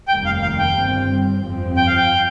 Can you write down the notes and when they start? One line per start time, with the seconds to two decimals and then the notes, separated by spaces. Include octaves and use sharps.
0.08 F1 D#2 D#3 G3 A#3 G5
0.25 F5
0.42 F5
0.59 G5
0.76 G1 G2 G3 C4
1.43 G1 F2 F3 C4
1.77 G5
1.87 F5
1.96 G5